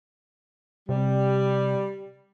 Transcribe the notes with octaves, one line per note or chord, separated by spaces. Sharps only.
C3 G3